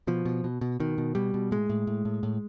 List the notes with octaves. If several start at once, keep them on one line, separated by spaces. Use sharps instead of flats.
B2 F3
B2
B2
B2
B2 D#3
B2
B2 G3
B2
A2 G#3
A2
A2
A2
A2